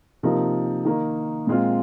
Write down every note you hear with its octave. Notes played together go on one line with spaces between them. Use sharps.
C3 F3 A#3 D#4
D#3 A#3 D#4
A#2 G#3 C4 F4